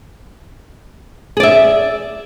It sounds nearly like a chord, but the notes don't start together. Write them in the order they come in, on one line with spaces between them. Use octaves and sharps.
G#4 D5 E5